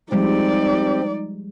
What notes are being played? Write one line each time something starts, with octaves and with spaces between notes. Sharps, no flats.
F3 G3 G#3 C4 D#4 G4 D5